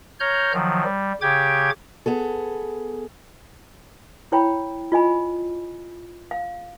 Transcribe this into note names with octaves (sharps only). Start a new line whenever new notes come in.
C#5 A#5 F6 G6
D#3 F3 F#3
G3
C#3 G4 G5 D6 G#6
B3 G#4 A4
E4 C#5 G5 B5
F4 D#5 G#5 B5
F5